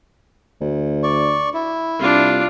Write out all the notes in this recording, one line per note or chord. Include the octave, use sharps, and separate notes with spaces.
D2
D5 C#6
E4
C2 D4 F4